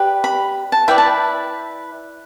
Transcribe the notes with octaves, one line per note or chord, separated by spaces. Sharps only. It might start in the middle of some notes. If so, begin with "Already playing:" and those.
Already playing: G4 B4 D5
B5
A5
E4 B4 D5 G5
A5